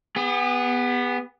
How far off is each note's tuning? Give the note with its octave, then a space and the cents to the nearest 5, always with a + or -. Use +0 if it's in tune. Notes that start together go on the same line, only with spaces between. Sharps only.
B3 +0 G#4 -45